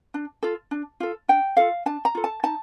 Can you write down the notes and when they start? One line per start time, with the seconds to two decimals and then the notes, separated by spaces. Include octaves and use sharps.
0.14 D4
0.43 F4 A4
0.71 D4
1.00 F4 A4
1.28 D4 G5
1.57 F4 A4 F5
1.86 D4 A5
2.05 A#5
2.15 F4 A4
2.24 A5
2.43 D#4 A5